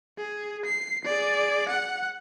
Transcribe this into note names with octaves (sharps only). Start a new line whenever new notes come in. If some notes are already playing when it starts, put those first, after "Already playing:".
G#4
C7
G#4 D5
F#5